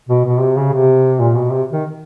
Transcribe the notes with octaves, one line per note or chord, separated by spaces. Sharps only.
B2
B2
C3
C#3
C3
A#2
B2
C3
D#3